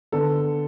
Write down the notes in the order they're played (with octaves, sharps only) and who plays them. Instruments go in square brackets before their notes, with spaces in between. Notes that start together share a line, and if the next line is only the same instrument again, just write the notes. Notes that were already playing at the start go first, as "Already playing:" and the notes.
[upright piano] D3 B3 A4